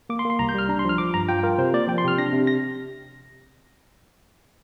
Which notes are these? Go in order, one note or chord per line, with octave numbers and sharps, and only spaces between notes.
A#3 D6
C6
A#3
C6
C2 A#5
G6
G3 F6
D4 A#5
C6
F3 F6
F3 D6
G2 A#5
F4 G5
F4 A#4
C3 C5
A#3 D5
F3 G5
C6
C3 F6
D4 A#6
C3
A#6